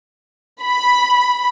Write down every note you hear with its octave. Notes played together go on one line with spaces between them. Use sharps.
B5